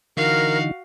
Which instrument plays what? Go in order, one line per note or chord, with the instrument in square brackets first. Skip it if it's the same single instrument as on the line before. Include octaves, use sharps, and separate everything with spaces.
[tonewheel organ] D3 E3 D#4 [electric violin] F#4 F5 [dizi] A#4